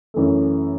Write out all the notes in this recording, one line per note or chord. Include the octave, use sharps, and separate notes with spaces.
F#2 E3 A3